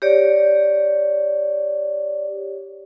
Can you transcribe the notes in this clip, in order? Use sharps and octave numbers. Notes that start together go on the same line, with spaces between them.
G4 C#5 D5